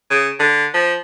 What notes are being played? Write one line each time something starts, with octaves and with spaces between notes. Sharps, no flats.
C#3
D3
F3